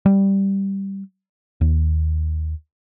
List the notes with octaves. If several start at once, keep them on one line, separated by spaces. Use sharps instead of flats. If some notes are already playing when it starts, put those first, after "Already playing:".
G3
D#2